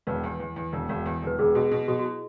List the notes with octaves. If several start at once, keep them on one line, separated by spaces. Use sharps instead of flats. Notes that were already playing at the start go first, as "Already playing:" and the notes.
E1 B4
E2
E2
E2
E1
E1
E2
E1 B4
E1 G#4
B2 F#4
B2 E4
B2 F#4
F#4
E4